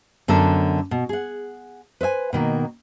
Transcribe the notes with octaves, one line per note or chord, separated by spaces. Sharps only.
F#2 D3 B3 A4 A#4
B2
G#4 F#5
B4 C5 E5 G#5
B2 D#3 A#3